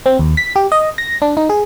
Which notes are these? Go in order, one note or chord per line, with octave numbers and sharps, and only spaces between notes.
C4
D#2
B6
G4
D#5
A#6
D4
D#4
G#4